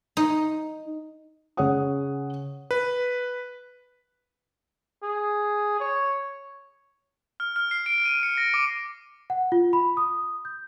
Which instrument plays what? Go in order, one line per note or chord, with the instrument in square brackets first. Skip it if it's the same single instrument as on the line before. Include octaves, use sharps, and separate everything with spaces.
[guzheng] D#4
[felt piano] C#3 G#4 C#5 F#5 D#6
[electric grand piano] B4
[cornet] G#4
C#5
[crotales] F6
F6
C7
D7
D#7
C#7
A#6
D6
[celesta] F#5
F4
B5
D#6
G6